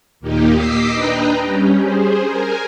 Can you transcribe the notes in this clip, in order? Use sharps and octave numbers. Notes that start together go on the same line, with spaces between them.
D#2 A#2 A#3 D#4 G4
D#5 D6 E6 B6 C7
D4 B4 D#5 G5 A#5
G3 C#4 G4
G#4 C5
A#4 G#5